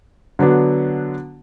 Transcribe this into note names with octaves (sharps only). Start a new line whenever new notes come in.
D3 F#3 B3 D4